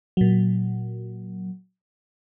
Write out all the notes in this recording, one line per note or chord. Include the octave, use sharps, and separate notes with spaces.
A#2 F#3